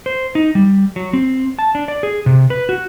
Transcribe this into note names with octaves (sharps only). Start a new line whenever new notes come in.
C5
D#4
G3
F#3
C4
A5
D4
D5
G#4
C3
B4
F#4